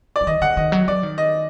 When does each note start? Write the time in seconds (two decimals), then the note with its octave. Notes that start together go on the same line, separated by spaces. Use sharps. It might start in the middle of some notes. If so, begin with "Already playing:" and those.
0.16 D5
0.21 F#3
0.27 D#3 D#5
0.41 D3 F#5
0.57 D#3 D#5
0.72 F#3
0.88 F#3 D5
1.03 D#3
1.18 D#5